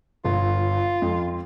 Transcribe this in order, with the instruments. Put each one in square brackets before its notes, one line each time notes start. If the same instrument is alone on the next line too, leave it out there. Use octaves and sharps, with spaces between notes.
[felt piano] G1 [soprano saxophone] F4
[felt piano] F2